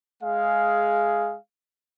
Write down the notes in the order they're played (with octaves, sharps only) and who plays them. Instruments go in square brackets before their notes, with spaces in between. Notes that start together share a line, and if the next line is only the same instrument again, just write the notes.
[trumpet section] G#3 G#4 F5